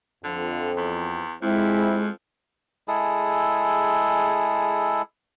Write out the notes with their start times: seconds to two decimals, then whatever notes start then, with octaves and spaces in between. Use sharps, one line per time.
0.24 F2 D3
0.77 E2
1.42 F2 G#3 C4 E4
2.88 G#3 E4 G#4 A4